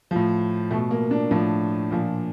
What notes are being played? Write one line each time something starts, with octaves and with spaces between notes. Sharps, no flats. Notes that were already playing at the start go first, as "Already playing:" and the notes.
A2 F3
B2 A3
A#3
D4
A2 F3 D4
A#2 F3